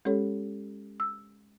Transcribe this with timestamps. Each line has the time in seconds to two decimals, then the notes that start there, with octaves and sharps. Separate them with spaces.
0.05 G#3 C#4 G4 A4 C#5
1.00 E6